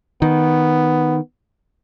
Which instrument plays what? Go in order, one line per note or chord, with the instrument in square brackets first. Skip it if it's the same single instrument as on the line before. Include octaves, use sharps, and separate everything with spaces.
[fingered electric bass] D#3 [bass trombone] B3